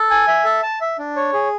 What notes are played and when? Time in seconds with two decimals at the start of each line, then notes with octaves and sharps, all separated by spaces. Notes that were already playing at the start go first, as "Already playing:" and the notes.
Already playing: A4
0.10 G#5
0.28 E5
0.44 A4
0.63 A5
0.81 E5
0.99 D4
1.16 C#5
1.33 G#4